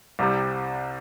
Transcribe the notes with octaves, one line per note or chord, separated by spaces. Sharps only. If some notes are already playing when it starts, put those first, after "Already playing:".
C2 C3 G3